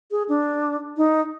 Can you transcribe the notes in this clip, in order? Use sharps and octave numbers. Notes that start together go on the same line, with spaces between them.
G#4
D4
D#4